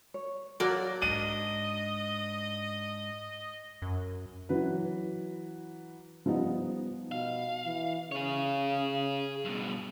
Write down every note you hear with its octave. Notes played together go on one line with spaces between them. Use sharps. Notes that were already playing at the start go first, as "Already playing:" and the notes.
C#5
F#3 A#3 F#4 D5
G#2 D4 D#5 D#7
F#2
E3 F#3 B4
F3 G3 B3 D#4
B2 F5
E3
C#3 G#4 C#5
G2 B2